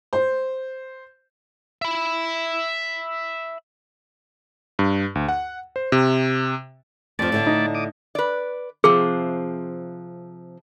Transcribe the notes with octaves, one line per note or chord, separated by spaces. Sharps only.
C5
E5 B5
G2
D2
F#5
C5
C3
F2 F3 A3 D5 A5
A2 D3 D4
D#4
D6 D#6
B4 D5
C3 F3 C4 G#4